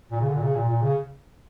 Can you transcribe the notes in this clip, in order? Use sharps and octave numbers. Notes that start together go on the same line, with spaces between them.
A#2
C#3
D3
A#2
C#3
A#2
A#2
C#3